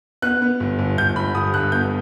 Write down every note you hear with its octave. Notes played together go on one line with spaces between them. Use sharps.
B3 F#6
B3
G1
G1
G1 G6
G1 B5
G1 D#6
G2 F#6
B3 G6